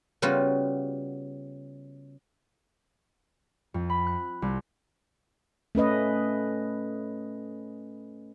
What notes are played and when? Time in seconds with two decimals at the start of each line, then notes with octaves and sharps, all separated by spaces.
0.22 C#3 G3 B3 F4 F#4
3.74 F2
3.90 B5
4.07 F#6
4.42 C2
5.75 A3 C#4 B4 D#5